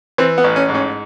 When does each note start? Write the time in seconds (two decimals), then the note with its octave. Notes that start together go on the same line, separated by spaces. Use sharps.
0.18 E3 C4
0.38 B3
0.44 A1
0.56 C#4
0.69 G#2
0.75 C#4